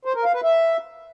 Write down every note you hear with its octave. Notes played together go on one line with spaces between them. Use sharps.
C5
A#4
F5
B4
E5